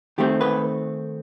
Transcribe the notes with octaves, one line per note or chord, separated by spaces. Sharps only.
D#3 A3 C4 G4
B4